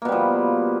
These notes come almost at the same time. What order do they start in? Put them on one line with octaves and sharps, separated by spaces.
A#3 B2 G3 F3